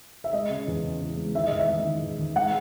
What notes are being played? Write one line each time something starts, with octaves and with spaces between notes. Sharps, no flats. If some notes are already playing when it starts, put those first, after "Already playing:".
E5
G#3 D#5
C#3
E2
C#3
E2
G#3
D#3 E5
D#5
E2
E5
G#3
D#3
E2
D#3
G#3 F#5